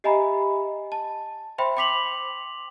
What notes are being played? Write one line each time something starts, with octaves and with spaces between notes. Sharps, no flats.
G4 D#5 E5 G#5 A#5 B5
A5
C5 E5 G5 B5 C6
G5 C6 D6 B6 F7 F#7